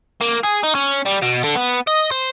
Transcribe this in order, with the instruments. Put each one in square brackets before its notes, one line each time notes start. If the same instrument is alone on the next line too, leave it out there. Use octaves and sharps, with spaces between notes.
[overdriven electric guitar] A#3
G#4
D#4
C#4
G3
B2
D3
B3
D#5
C5